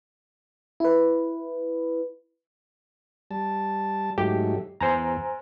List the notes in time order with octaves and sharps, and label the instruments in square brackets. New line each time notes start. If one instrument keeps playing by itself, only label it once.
[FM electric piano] E4 B4
[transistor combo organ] G3 A5
[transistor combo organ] G#2 F#3 A3 [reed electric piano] G4
[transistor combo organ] E2 [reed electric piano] C5 G#5 A#5